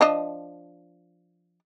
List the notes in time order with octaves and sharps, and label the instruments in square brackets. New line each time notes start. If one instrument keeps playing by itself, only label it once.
[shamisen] F3 D4 D#5